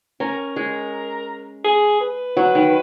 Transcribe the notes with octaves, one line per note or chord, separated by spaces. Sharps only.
C#4 A#4
G#3
G#4
B4
F#3
D#3